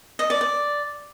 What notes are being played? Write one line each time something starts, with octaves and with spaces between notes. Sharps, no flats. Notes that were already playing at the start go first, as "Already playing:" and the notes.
D#5
D5
D5